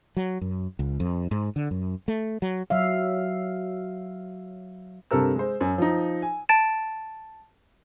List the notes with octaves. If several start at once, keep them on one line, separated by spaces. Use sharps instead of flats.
F#3
F#2
C#2
F2
G#2
D3
F#2
A3
F#3
F#3 E5 F5
G2 C3 A4 A#4 E6
G#3 C5
F#2
F3 D#4
G#5
A5 A6 D7 E7